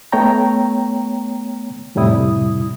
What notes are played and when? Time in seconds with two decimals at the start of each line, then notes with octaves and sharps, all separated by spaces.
0.12 A3 B3 C#5 G5 A#5
1.95 F2 A2 C3 G3 E4 D#6